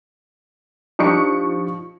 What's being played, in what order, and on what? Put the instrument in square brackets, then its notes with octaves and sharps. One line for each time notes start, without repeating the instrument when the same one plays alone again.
[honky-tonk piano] F3 C#6 C#7 [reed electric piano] D4 D#4 G4